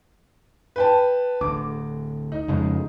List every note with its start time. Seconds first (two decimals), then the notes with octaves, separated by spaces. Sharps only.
0.76 B4 G5 A5
1.41 D1 D2 D6
2.32 D#4
2.48 F2 C#3 G#3